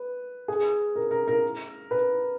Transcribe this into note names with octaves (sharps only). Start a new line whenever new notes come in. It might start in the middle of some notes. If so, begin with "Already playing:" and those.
Already playing: B4
G#4
A#4
A#4
A#4
B4